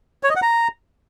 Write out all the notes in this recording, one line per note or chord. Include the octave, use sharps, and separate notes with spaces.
C#5
D#5
F#5
A#5